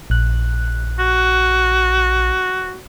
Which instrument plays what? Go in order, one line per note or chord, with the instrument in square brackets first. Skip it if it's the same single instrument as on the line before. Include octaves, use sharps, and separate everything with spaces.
[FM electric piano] A#1 F#6
[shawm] F#4